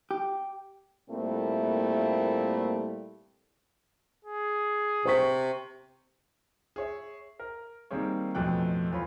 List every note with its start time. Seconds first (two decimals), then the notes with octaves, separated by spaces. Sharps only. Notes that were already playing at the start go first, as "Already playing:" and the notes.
0.11 G4
1.10 A#2 G3 A3 A#3 C4 E4
4.25 G#4
5.05 C3 C5 C#6 B6
6.76 G#4 C#5 E5
7.40 A#4
7.91 D#3 G3 A#3 C4 G#4 C#5
8.35 A1 F2 B2 A3 G5 F#6
8.92 E2 F4 C#5 B5